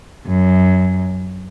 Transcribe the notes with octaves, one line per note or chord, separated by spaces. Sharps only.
F#2